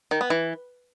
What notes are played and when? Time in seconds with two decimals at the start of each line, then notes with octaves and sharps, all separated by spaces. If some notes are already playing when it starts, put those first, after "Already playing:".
0.11 D#3
0.21 B3
0.30 E3